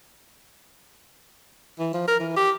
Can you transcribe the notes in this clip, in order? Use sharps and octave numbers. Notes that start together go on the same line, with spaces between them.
E3
F3
A#4
E3
G4